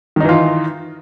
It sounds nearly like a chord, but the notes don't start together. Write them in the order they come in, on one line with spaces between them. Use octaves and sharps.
D#3 D#4 E3 F4